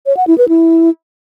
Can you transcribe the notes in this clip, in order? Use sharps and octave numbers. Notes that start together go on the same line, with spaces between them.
C#5
F#5
E4
B4
E4